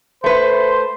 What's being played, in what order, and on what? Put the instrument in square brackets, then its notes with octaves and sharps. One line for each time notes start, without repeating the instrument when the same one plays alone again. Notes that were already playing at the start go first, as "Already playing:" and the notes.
[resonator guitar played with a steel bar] A3 B4 [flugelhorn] C5